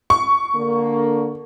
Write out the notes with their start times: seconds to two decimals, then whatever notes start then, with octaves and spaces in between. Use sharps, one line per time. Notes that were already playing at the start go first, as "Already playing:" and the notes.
0.10 C#6
0.55 D3 A#3